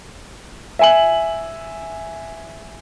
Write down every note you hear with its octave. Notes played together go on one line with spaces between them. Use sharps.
E5 G#5 F#7